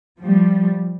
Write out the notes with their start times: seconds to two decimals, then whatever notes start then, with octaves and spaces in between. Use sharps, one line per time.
0.19 F3 G3